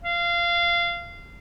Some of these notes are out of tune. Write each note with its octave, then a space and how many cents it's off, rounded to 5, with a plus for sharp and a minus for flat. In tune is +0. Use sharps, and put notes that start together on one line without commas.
F5 -20